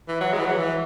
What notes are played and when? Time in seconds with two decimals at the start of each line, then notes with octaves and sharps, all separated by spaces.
0.08 E3
0.21 F#3
0.33 G#3
0.39 E3
0.46 F#3
0.59 E3